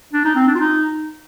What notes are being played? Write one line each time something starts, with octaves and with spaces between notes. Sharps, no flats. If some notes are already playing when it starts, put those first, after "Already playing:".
D4
D#4
C4
D4
F4
D#4